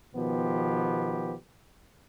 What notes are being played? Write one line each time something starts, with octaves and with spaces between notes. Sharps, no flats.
B2 D#3 F3 B3 G4